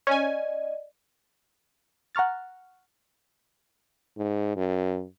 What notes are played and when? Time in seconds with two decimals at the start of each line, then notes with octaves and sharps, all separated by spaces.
0.07 C#4 D5 D#5 G#5
2.15 F#5 A#5 C#6 F6 A6
4.18 G#2
4.56 F#2